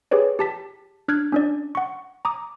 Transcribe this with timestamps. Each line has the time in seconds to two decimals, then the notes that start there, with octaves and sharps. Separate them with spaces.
0.11 G4 G#4 B4 C#5 D5
0.39 G4 A5 B6
1.08 D4 F6 F#6 G#6
1.32 C#4 D4 D5
1.75 F#5 C#6
2.25 A#5 D6 D#6